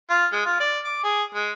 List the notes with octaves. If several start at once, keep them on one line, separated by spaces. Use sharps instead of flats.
F4
G#3
F4
D5
D6
G#4
G#3